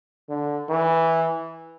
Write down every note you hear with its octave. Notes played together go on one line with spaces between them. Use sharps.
D3
E3